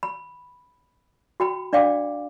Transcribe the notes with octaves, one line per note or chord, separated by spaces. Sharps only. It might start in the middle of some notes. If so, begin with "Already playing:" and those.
B5
F#4 G5 B5
D4 D5 F5 G5 D6